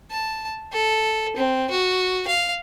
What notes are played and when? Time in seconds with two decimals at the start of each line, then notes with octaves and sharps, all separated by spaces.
0.11 A5
0.73 A4
1.37 C4
1.71 F#4
2.28 F5